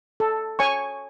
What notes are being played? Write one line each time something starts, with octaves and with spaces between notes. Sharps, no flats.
A4
C#5 G#5 C#6